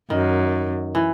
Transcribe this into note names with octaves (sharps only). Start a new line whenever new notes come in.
F#2 D#3
E3